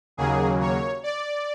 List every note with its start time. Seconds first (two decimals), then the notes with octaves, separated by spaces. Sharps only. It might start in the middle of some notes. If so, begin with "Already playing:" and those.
0.17 D#2 C#3 F#3 A#3 G#4
0.60 C#5
1.03 D5